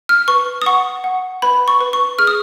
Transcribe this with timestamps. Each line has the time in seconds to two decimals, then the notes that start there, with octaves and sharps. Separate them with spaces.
0.09 F6
0.28 B4 C#6
0.62 D#6
0.66 F#5 C#6
1.04 F#5
1.42 B4 B5
1.68 C#6
1.81 B4
1.93 C#6
2.19 G#4 F6
2.27 D#6